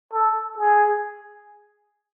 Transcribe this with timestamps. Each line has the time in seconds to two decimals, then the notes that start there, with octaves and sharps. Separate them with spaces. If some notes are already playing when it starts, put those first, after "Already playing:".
0.13 A4
0.58 G#4